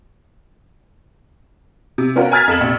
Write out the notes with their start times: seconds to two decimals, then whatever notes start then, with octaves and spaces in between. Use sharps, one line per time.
1.98 C3
2.15 B3 C#4 F4 F#4 A#4
2.32 G#5 A#5 F6 G#6 A6 B6
2.48 F2 A4 E7 F#7
2.60 A#1 C3